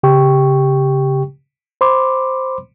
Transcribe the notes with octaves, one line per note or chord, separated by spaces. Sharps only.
C#3 G4 G5 C#6
C5 B5 C6 D6